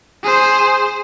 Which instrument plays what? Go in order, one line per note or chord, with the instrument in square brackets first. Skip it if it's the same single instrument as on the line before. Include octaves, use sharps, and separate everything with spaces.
[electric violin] G#4 C5